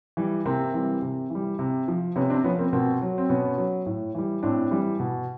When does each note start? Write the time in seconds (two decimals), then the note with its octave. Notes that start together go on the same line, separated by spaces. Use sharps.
0.17 E3 G3
0.45 C3 A#3 C4
0.74 E3 G3
1.02 C3
1.30 E3 G3
1.59 C3
1.88 F3
2.16 C3 B3 C#4
2.30 C4 D4
2.44 F3 B3 C#4
2.59 A#3 C4
2.72 B2 A#3 C4
3.02 F#3
3.18 C4
3.29 B2 B3 C#4
3.58 F#3
3.86 A2
4.15 E3 G3
4.43 A2 C4 D4
4.71 E3 G3
5.00 B2